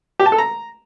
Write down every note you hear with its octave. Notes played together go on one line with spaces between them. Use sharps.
G4
A5
A4
A#5